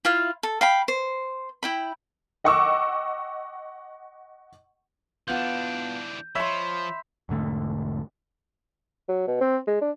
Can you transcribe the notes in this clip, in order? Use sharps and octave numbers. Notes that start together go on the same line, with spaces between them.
E4 F4 F5
A4
F5 G5 B5
C5
E4 G5 B5
D#5 F#5 G5 C#6 D6 E6
E3 B3 D4 F4 G6
F3 C#5 E5 B5 C6
E1 G#2 D3 A3
F#3
B2
C4
G#3
D4